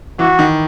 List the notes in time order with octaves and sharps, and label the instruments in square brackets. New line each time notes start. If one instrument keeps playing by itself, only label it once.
[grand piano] E3 [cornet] F#4
[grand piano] D#3